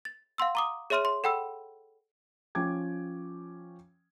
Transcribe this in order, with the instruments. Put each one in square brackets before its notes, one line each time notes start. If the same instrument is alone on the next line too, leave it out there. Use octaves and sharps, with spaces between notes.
[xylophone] A6
F5 F#5 C6 E6
A#5 D6 D#6
G#4 C#5 E5 C6 F6 D#7
C6
A4 F#5 G5 B5 E6
[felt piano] F3 C#4 G5 D6 G#6